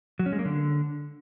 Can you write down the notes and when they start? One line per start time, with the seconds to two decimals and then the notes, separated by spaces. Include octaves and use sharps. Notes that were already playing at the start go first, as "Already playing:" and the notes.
0.19 F#3
0.26 C#4
0.32 G#3
0.39 A#3
0.45 D3